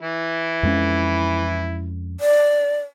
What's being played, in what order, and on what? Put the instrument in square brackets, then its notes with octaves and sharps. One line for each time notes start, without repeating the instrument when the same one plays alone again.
[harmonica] E3 E4
[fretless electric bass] F2 G#3 C#4
[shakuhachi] D5